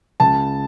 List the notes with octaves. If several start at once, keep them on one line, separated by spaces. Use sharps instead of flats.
C#2 A5